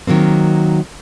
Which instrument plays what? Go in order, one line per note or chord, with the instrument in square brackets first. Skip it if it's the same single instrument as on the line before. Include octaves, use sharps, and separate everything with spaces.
[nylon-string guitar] D#3 F#3 A#3 C4